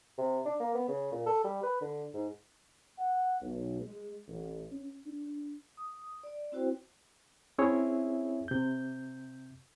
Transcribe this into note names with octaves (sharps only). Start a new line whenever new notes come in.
C3
D4
A#3
B3
C#3
A#2
A4
G3
B4
D3
G#2
F#5
B1
G#3
A1
C#4
D4
D#6
D5
C4 E4 F#4 C5 G5
C4 C#4 E4 G#4 C#5 E5
C3 G6